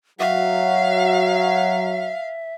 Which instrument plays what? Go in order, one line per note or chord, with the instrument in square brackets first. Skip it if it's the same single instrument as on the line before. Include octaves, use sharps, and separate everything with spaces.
[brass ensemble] F#3 [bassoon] F#4 [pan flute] E5 [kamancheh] F5